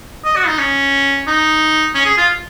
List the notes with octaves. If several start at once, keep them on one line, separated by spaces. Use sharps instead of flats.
D#5
F#4
D#4
C#4
D#4
C#4
G#4
F4